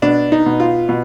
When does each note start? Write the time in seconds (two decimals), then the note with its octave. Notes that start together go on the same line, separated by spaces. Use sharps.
0.02 B2 D4
0.32 D#4
0.46 B2
0.60 F4
0.89 B2